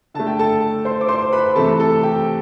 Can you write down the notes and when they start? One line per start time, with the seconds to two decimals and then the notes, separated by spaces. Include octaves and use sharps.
0.14 D3 A3 A5
0.27 G5
0.39 A4 A5
0.85 C5 C6
1.01 D6
1.08 C5 C6
1.32 B4 B5
1.51 B5
1.56 C3 E3 A3 A4 A5
1.80 A4 A5
2.03 G4 G5